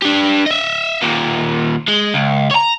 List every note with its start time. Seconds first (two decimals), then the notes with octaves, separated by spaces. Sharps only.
0.02 D4 G4
0.46 D#5 E5
1.02 D#2 A#2
1.88 G#3
2.14 C#2
2.51 C#5 A#5